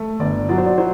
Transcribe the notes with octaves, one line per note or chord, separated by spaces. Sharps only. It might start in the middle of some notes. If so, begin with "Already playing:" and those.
Already playing: A3
G1 D5
F#3 D5
C5
D5
F#3 C5